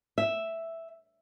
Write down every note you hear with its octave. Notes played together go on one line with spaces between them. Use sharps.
E5